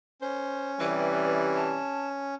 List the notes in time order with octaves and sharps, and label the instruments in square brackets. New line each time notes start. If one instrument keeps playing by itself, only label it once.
[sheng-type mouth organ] C#4 [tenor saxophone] C5
[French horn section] C3 G3 [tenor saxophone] E3 [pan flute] B4
[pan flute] A5